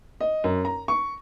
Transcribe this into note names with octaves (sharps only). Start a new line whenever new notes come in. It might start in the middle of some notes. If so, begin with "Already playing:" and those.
D#5
F#2
A#5
C#6